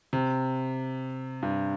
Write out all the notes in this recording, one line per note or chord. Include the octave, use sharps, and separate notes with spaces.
C3
G2